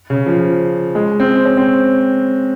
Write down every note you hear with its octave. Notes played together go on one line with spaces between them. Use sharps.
C#3
F3
G#3
C4
C#4
C4